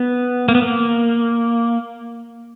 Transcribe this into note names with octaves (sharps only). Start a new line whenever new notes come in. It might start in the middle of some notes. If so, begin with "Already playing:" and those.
Already playing: B3
A#3
B3
A#3